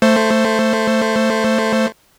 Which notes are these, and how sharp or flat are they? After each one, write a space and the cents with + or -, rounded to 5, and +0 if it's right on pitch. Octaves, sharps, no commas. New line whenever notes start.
A3 +10 C5 +0